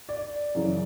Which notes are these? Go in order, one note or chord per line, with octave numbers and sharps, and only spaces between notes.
D5
F#2 C#3 E3